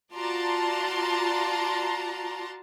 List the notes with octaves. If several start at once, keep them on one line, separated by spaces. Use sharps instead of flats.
F4 F#4 D5 A5 A#5 C6